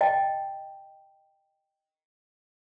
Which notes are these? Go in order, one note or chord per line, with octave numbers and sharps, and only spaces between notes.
D#5 G5 A5